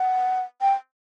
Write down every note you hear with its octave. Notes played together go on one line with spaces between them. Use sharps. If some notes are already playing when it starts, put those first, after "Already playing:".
Already playing: F#5
G5